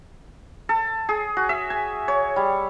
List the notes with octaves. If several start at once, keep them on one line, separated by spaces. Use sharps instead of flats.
A4
G#4
F#4
E5
G#5
C#5
G3